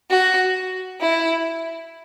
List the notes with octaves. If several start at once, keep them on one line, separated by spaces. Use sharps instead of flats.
F#4
E4